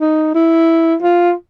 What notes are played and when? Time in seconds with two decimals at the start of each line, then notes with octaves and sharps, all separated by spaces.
0.01 D#4
0.35 E4
1.02 F4